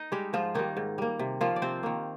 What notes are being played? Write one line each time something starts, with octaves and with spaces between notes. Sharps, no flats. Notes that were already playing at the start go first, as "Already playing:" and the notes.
Already playing: D#4 D#5
G3 G#3 G4
G#2 F3 F4
D#3 G3 A#3 D#4
G#2
G3 A#3
C3
D#3 F3 A#3 F4
D5
C3 C4 C5
D#3 A#3